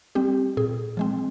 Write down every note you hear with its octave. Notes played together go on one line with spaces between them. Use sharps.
G3 C4 G4
A#2 G#4
F3 G#3 C4